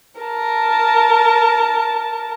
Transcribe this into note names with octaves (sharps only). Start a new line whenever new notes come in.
A#4 A5